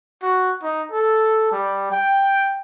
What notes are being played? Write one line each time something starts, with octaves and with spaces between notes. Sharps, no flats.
F#4
D#4
A4
G3
G5